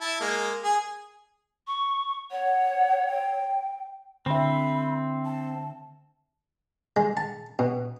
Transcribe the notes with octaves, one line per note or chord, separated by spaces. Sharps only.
E4 A5
G#3 A#3
G#4
C#6
C#5 F#5
G5
D3 C4 E5 B5
A5
G#3
A5
B2